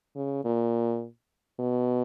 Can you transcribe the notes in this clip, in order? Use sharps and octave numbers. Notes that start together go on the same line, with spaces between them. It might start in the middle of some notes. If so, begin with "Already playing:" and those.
C#3
A#2
B2